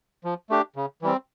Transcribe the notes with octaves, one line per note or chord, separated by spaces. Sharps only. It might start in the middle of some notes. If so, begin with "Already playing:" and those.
F3
A3 D4 G4
C#3
E3 G3 C4